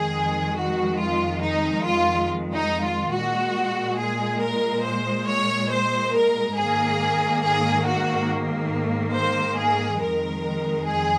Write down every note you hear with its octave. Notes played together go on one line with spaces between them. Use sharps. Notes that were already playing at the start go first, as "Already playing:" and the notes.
Already playing: F2 D#3 G#3 G#4
F#4
F4
D#4
F4
D#4
F4
A#2 G#3 F#4
G#4
A#4
C5
C#5
C5
A#4
G#2 D#3 A#3 G#4
G#4
F#4
C5
G#4
F2 D#3 G#3 A#4
G#4